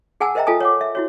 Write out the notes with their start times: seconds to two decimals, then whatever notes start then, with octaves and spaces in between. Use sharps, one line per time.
0.20 G#4 F#5 G#5 A5 E6
0.35 A#4 C5 D#5 E5 G5 A#5
0.47 F4 A4 G#5 A5 D#6
0.61 C#5 F#5 D6
0.81 E5
0.95 E4 F#4 C#5